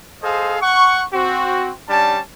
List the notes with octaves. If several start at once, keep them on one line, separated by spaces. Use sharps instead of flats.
G#4 A4 C5 D#5 F5
F#5 C#6
C4 F#4
G3 C#4 D4 A5